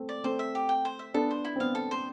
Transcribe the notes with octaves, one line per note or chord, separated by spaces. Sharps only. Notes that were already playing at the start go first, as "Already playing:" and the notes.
Already playing: A3 C4
D5
A3 C4 C5
E5
G4
G5
C5
E5
B3 D4 A4
C5
E4
C4
B3 F5
A4
C5